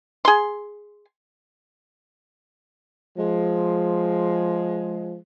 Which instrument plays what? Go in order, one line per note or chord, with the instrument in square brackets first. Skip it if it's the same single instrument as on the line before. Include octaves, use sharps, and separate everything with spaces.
[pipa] G#4 C6
[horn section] F3 G#3